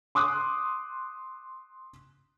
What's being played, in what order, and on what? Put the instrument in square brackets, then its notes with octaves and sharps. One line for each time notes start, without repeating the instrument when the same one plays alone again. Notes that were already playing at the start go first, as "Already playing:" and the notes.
[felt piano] C6 D6 D#6 F#6